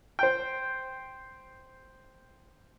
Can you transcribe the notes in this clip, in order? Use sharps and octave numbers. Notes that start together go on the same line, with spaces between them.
C5 G5